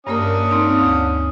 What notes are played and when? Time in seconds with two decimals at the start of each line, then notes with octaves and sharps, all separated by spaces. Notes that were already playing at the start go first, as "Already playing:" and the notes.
0.07 G2 A#3 C#4 D4 A#4 D#6
0.51 C4 D#4
0.79 D2